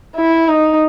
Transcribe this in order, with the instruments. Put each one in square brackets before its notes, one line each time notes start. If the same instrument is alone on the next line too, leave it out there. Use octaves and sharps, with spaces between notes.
[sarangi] E4
D#4